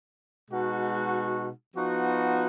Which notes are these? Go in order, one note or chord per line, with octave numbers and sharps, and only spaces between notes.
B2 G#3 D#4 F#4
F3 B3 D#4 F#4